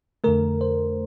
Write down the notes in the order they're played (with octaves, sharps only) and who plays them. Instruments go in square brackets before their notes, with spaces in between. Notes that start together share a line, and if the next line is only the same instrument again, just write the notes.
[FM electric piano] F2 D3 A3 A#4
C5